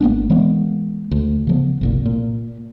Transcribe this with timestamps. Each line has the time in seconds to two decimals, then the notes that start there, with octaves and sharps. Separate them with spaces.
0.01 G#1 A#3 B3 D4
0.30 E3 G#3 A#3 B3
1.11 D2
1.47 C#3 F3 B3
1.81 G1 C2 A#2
2.06 A#2